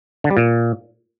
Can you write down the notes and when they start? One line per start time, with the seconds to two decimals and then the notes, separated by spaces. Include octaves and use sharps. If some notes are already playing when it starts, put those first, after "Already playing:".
0.24 D3
0.30 G3
0.37 A#2